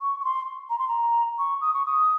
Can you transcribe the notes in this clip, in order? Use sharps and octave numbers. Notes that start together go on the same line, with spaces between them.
C#6
C#6
C6
A#5
C6
A#5
C#6
D#6
C#6
D#6